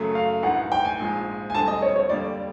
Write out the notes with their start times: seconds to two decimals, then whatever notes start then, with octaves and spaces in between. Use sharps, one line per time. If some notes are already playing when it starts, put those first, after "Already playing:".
Already playing: F#2 C#3 F#3 A3
0.15 F5
0.43 A1 G2 D#3 F#5
0.72 G5
0.85 G#5
0.99 A#1 G#2 F3 G#3
1.50 G#5
1.54 E1 D2 D3 G3 C4 A5
1.68 D#5
1.82 C#5
1.96 C#5
2.09 F2 D3 G3 A#3 D5